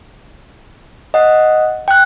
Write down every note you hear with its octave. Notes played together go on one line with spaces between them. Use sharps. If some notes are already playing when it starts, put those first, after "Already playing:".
D#5 F#5
G5 F#6